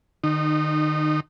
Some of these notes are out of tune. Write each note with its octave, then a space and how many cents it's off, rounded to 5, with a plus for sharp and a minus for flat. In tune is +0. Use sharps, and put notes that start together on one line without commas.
D#3 -40 D#4 -20